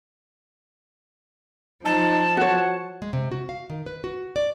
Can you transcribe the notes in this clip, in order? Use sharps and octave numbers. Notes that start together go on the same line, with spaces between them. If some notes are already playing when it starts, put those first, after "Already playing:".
F3 D#4 A5
F#4 C#5 F#5
G#3
C3
F#4
F5
D#3
B4
F#4
D5